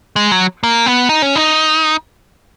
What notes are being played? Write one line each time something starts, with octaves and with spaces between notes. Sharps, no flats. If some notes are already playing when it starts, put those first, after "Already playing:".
G#3
F#3
A#3
B3
D#4
C#4
D#4